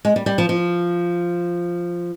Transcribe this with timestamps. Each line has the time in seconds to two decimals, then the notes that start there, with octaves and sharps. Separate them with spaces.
0.05 G#3
0.16 G3
0.26 G3
0.38 F3
0.49 F3